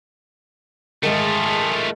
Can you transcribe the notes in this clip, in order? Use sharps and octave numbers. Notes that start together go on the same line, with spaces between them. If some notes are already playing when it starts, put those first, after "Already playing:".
G#2 D#3 A3 F4 G#4 A5